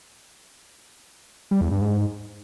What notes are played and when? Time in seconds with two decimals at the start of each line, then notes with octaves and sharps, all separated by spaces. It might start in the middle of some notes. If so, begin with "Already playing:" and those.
1.51 G3
1.61 E2
1.71 G2
1.81 G#2